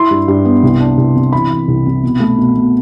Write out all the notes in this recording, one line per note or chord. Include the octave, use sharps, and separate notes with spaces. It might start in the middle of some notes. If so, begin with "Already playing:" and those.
Already playing: E4 C6
G2
G2
B3
C2
D4
C2
C3
E3 B5
E3
C2
C3
B2
A3
B2
B2